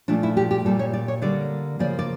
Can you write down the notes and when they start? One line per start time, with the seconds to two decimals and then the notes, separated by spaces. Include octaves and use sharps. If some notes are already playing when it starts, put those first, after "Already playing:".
0.08 A#2 F3 A3 D4
0.23 E4
0.37 G4
0.51 G4
0.65 A#2 G3 A#3 A4
0.79 C#5
0.93 D5
1.08 C#5
1.22 D3 G3 A#3 D5
1.79 C#3 F3 A#3 D5
1.99 D5